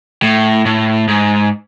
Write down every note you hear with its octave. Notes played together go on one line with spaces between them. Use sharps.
A2
A2
G#2